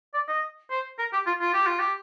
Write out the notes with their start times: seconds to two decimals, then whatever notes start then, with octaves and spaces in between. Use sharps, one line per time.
0.14 D5
0.28 D#5
0.71 C5
0.99 A#4
1.13 G4
1.27 F4
1.41 F4
1.54 G4
1.67 F4
1.80 G4